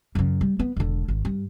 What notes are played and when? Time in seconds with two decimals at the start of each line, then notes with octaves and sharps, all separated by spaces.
0.15 F#2 C#3
0.41 G3
0.59 B3
0.76 E1 D3
1.08 G#1
1.25 G2